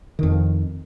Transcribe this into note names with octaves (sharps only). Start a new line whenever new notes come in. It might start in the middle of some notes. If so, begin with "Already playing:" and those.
F2 D#3